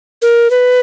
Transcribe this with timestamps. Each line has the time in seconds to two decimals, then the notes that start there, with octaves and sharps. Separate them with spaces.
0.22 A#4
0.51 B4